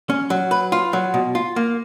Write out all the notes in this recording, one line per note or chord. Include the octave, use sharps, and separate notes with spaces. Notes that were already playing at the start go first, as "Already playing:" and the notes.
C#4
F#3
B4
F4
F#3
B2
F4
A#3